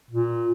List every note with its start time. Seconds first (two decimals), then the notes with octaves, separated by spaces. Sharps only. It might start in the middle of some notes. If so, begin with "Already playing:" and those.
0.11 A#2